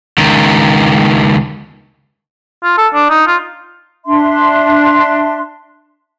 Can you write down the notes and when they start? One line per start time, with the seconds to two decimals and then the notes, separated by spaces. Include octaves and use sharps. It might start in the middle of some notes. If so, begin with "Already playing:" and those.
0.18 C#2 D#3
2.63 F4
2.78 A4
2.94 D4
3.10 D#4
3.27 F4
4.06 D4 E5 C6